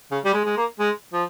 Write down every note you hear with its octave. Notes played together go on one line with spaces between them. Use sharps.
C#3
G3
G#3
G#3
A#3
G#3
F3